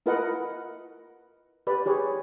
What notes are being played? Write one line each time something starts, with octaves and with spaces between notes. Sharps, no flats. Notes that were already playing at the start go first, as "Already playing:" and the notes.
E4 F4 A#4 B4 D#5 F#5
G4 B4 D5 B5
G4 G#4 C#5